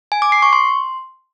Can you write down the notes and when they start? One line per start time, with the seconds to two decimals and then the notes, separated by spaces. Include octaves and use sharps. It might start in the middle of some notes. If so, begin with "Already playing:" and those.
0.12 G#5
0.22 D6
0.32 C7
0.42 C#6
0.53 C6